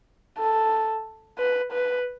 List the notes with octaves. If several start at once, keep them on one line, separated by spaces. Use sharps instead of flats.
A4
B4
B4